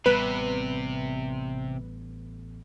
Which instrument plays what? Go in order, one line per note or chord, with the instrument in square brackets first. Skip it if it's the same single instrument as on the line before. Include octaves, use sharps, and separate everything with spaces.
[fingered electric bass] A1 G3 B3 [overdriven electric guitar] C3 [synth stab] B4